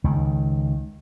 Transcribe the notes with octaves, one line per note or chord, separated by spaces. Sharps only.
C#2 D#3